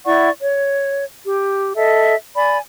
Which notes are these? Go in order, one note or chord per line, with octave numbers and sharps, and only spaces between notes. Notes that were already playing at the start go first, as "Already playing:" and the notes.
E4 D5 F#5 C#6
C#5
G4
A4 D#5 E5
D5 G#5 B5